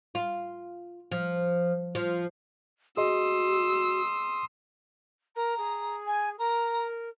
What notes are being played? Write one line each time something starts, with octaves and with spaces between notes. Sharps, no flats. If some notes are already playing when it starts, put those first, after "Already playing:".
F4
F3
F3
F#4 G#4 D#5 C6 D#6 E6
A#4 A#5
G#4
G#5
A#4 A#5